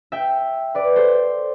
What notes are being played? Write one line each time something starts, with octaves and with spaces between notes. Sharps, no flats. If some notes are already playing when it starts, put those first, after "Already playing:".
E5 G5
B4 D5
A4 C5